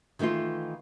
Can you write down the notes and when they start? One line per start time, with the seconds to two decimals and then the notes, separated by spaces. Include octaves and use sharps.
0.19 D#3 E3 A3 D#4 F4